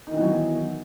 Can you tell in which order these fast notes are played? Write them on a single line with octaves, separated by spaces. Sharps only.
D#4 D#3 E3 B3 F#3